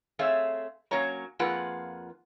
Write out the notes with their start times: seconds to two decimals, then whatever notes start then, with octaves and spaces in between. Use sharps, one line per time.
0.19 A3 C4 G#4 C#5 E5 F5
0.91 F#3 A#3 C#4 C#5 A#5
1.39 F2 A#3 F4 G#4 B4 F#5